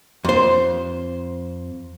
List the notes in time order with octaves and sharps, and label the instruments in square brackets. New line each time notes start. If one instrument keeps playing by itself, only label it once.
[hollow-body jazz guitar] F2 C5